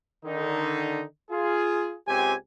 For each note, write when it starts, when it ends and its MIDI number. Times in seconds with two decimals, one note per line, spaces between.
0.25 1.04 50
0.25 1.04 51
0.25 1.04 63
1.31 1.96 65
1.31 1.96 68
2.08 2.34 37
2.08 2.34 60
2.08 2.34 67
2.08 2.34 80